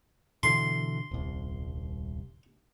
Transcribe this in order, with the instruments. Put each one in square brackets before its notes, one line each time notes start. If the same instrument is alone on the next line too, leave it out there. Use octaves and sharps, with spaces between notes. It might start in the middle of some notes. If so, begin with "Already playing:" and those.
[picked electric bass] B2 D3 E3 [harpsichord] C6
[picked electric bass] D#1 C2